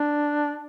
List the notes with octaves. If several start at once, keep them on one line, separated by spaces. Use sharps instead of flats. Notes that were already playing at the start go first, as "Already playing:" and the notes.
Already playing: D4